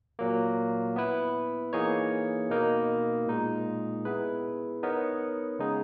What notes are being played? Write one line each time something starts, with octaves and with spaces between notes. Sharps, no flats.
A#2 F#3 A#3
B3 E4 B4
E3 A#3 D#4 G#4 C#5
B2 A#3 D#4 A#4
A#2 G#3 D#4
B3 E4 G#4 B4
B3 D#4 A#4 C#5
C#3 G#3 D#4 G#4